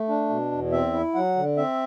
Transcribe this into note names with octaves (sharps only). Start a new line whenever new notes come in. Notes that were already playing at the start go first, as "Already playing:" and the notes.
Already playing: A3
D4
B2
E2
C4 E5
E4
F#3 F#5
D3
C4 E5